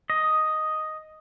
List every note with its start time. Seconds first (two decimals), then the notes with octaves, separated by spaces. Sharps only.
0.10 D#5